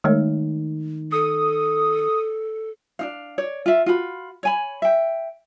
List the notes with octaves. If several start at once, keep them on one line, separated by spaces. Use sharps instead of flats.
D#3 G#3 A3 C#5
A4 D#6
D4 D#4 F5
C#5 D5
F4 E5
F4 F#4 B5
C#5 G#5 B5
E5 G5